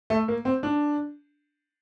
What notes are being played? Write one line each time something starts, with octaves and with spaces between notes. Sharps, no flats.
A3
A#3
C4
D4